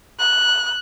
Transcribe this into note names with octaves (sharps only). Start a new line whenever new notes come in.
F#6